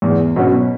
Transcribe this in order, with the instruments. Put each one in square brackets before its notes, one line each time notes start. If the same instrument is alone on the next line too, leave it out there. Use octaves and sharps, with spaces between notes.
[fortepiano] E2
B2 F#3 C#4